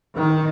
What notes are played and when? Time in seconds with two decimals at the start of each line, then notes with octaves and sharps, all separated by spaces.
0.17 D#3